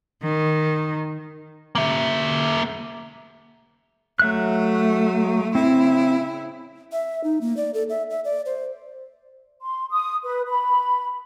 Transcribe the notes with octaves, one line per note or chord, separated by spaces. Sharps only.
D#3
A#3 E5
F#3 A3 E5 F#6
C#3 C4 E4
E5
D#4
A#3
D5
A4
E5
E5
D5
C5
C6
D#6
B4
B5